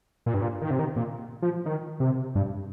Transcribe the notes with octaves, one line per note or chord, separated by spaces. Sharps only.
A#2
G2
A#2
D#3
C3
D#3
A#2
F3
D#3
C3
G2